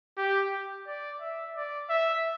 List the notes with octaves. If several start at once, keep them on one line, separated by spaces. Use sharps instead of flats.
G4
D5
E5
D5
E5